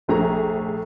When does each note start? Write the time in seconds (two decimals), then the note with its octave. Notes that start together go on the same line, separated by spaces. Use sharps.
0.08 F1 A#1 A3 G#4 A#5